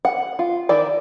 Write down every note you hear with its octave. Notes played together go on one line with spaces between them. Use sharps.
F#5
F4
D#3 E4 D5